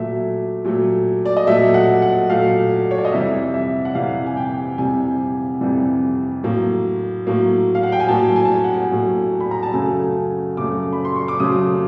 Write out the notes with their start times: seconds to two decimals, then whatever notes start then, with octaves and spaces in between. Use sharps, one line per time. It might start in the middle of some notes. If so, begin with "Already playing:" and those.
Already playing: A#2 F#3 A3 E5
0.65 A#2 F#3 A3
1.26 D5
1.37 D#5
1.47 A#2 F#3 A3 E5
1.74 F#5
2.02 F#5
2.29 A#2 F#3 A3 F5
2.91 C#5
2.98 D5
3.05 D#5
3.12 F2 C3 E3 G3 E5
3.54 E5
3.85 F#5
3.95 F2 C3 E3 G3 F5
4.27 G#5
4.37 G5
4.78 F2 C3 E3 G3 G#5
5.61 F2 C3 E3 G3
6.43 A2 F#3 A#3
7.27 A2 F#3 A#3
7.75 F5
7.83 F#5
7.92 G5
8.00 G#5
8.08 A2 F#3 A#3 A5
8.36 G#5
8.45 A5
8.54 G#5
8.64 F#5
8.91 A2 F#3 A#3
9.40 B5
9.51 A#5
9.63 A5
9.74 F#2 C#3 F#3 A3 G#5
10.57 F#2 C#3 F#3 A3 D6
10.93 B5
11.05 C6
11.16 C#6
11.28 D6
11.40 F#2 C#3 F#3 A3 D#6